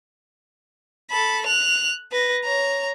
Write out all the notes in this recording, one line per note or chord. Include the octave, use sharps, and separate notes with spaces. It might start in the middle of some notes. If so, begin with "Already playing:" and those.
A4 B5
F#6 F7
B4 A#6
C#5 A#5